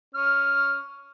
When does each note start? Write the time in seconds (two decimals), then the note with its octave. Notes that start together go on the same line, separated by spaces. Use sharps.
0.15 C#4 F6